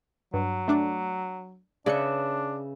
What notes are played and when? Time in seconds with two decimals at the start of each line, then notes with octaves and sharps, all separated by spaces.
0.34 G2 F#3
0.68 A3 D4 D6
1.86 C#3 D4 B4 D5 E5 C#7